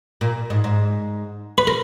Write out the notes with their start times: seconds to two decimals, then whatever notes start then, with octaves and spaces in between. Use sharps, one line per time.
0.21 A#2
0.50 G#2
0.64 G#2
1.58 B4
1.67 A#4